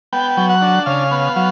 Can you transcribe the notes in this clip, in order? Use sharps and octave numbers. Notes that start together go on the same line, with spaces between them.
B3 G5
F#3
F#5
D4
C#3 F5
B3
F#3